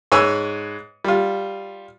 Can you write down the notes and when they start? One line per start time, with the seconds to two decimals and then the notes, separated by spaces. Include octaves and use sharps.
0.12 G#2 B4 C#5 G#5 E6
1.04 G3 F4